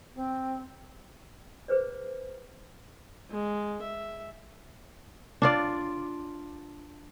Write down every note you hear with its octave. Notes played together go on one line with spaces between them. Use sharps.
C4
G#4 B4 C5 D5
G#3
E5
D4 F4 D5